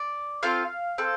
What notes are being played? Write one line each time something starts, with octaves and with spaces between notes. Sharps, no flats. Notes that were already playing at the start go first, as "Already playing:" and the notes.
Already playing: D5
C4 F4 A4 F5
C4 A4